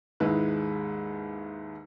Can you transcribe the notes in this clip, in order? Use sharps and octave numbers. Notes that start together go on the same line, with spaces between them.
D#2 G#2 G#3 E4 B4